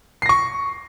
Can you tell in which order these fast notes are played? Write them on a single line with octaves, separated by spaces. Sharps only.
C7 A#6 C#6